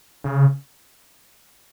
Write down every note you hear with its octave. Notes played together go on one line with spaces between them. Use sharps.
C#3